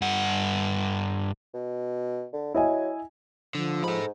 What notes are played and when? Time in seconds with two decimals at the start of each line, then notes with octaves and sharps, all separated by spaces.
0.02 G2 F#5
1.54 B2
2.33 D3
2.54 F#3 E4 D#5 G#5
3.55 D3 F3
3.84 G#2 A4 B5